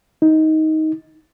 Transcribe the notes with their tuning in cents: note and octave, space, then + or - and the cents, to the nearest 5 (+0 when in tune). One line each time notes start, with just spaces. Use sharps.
D#4 +15